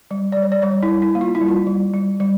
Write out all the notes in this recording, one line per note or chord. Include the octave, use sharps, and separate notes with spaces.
G3
D5
G3
C#5
D5
G3 C#5
E4
G3
E4
A#3
F4
E4
G3
F4
G3
G3
G3